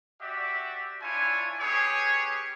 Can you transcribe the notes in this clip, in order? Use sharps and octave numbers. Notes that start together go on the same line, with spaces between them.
F#4 G4 D5 E5
D4 E4 F4 C#5 G#5
C#4 G4 G#4 B4 C#5